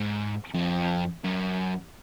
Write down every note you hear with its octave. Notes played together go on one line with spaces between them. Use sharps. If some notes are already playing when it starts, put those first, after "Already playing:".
Already playing: G#2
F2
F#2